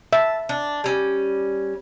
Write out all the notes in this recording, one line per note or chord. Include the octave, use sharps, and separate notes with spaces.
E5 A5
D4
G3 C#4